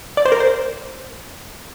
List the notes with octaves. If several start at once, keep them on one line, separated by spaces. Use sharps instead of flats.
D5
C5
A#4
C5